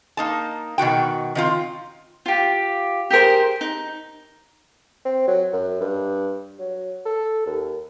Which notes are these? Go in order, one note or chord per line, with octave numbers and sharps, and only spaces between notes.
A#3 D#4 A5
B2 D#3 F#4 G5
D#3 C4 F4
F4 G4
G4 G#4 A#4 C5
D#4
C4
F#3
F#2
G2
F#3
A4
D#2